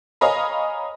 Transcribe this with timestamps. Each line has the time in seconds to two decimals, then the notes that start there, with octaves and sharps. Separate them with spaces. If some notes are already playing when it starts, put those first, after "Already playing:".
0.21 C#5 D#5 F5 G#5 A#5 B5